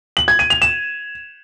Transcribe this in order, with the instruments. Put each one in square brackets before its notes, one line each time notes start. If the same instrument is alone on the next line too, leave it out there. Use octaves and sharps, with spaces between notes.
[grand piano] F#7
G#6
D#7
F7
E7